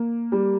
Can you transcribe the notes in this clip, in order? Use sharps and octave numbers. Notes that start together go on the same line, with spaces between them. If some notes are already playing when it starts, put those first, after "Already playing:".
Already playing: A#3
G3